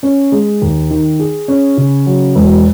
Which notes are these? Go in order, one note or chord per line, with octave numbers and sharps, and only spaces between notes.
C#4
G#3
D#2
D#3
G#4
C#4
C#3
F#3
E1